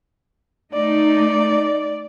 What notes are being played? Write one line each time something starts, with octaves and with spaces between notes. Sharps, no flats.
A3 D#4 D5